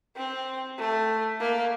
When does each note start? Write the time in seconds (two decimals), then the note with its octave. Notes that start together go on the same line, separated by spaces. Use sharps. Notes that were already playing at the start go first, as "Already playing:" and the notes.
0.16 C4
0.78 A3
1.40 A#3